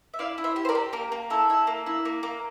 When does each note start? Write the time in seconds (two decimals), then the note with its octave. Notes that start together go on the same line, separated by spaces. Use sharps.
0.14 E5
0.19 E4 D5 F5
0.38 E4
0.44 C5 E5
0.56 G4
0.65 C5
0.69 A#4 D5
0.75 G4
0.93 A#3 A#4
1.12 A#3
1.30 E4 A4
1.50 E4
1.67 A#3
1.86 E4
2.05 A#3
2.23 A#3